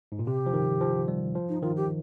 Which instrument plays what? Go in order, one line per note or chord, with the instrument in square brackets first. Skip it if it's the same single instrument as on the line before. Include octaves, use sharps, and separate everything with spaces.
[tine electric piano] G#2
A#2
[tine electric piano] C3 [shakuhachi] G4
[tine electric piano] F3
D#3
F3
G3
F3
[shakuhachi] D#4
[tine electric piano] D#3 [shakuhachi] F4
[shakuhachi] G4